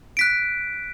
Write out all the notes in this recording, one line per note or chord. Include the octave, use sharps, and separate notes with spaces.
F#6 B6 D7